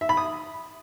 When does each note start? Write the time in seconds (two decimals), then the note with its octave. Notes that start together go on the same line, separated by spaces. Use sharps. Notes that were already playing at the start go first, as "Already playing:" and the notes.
0.01 E5
0.09 B5
0.17 D#6